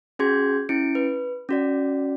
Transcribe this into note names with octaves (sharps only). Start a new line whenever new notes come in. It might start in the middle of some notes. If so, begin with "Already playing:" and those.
C#4 F#4 G#4 C6 G6 G#6
C#4 E4 C#7 D7
B4
C#4 F#4 D5